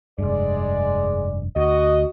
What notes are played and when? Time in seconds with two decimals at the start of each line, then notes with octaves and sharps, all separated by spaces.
0.19 F1 G2 G#3 D5
1.56 D2 F#4 D#5